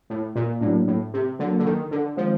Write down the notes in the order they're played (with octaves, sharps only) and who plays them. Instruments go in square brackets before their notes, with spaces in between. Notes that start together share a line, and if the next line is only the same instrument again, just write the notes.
[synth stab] A2
A#2
[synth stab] A2 [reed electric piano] F#3 A#3 D4
[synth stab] A2
C3
[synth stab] D3 [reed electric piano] F#3 A#3 D4
[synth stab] D3
D#3
D3
[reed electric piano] D#3 G#3 C4 F4 [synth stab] F3